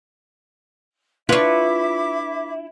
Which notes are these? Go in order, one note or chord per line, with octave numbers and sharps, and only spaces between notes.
D4 E4 F4 B4 E5 B5 C#6 D6